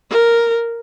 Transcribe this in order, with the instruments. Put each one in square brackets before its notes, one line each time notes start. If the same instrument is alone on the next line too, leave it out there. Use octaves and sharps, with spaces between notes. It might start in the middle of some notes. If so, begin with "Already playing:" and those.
[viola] A#4